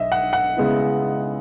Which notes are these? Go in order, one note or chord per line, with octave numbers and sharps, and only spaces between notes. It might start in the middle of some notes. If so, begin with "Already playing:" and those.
Already playing: B1 D#5 E5
F#5
F#5
C#3 G#3 B3 E4